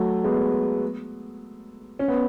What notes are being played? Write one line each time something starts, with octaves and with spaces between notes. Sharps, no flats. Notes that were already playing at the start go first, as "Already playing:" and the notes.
Already playing: F#3 A3
G#3 B3
C#4
B3